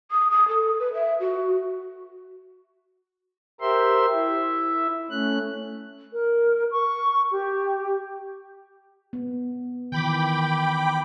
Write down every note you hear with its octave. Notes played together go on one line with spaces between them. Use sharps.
D#6
D#6
A4
B4
E5
F#4
G4 A#4 C5 E5 C6
E4 E5
A3 C#4 F#6
A#4
C#6
G4
B3
D#3 E3 G5 B5 D6